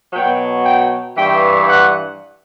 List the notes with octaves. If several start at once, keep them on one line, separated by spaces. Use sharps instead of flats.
B2 F#3 G5
G5
G2 E3 G5
F#5